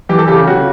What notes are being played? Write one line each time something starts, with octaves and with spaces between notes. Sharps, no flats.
E3 G4
A4
C#3 G4
C#3 F#4